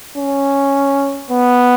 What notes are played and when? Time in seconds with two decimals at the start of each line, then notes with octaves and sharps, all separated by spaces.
0.18 C#4
1.30 B3